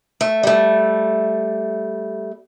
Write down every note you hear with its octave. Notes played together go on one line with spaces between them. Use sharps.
A3
G3 A3